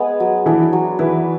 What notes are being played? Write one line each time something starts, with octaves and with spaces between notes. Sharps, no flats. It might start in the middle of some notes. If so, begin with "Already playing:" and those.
Already playing: G#3 B3 G#4
F#3
E3 D4 E4
F#3
E3 E4 B4